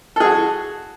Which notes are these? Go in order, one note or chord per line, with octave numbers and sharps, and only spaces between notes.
F#4 G#4 A4